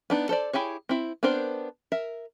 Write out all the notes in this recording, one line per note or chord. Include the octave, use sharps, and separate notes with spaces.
B3 D4 D#4
A4 C5 D5
E4 G4 G#4 C#5
C4 E4
B3 C4 D4 A#4 C5
A#4 E5